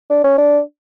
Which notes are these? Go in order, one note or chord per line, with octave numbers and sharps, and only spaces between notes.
D4
C#4
D4